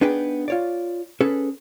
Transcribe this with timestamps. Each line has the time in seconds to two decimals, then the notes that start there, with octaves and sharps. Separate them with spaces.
0.01 B3 D4 D#4 G#4 B4 G5
0.48 F4 C#5 D5
1.21 C#4 G#4 A4 B4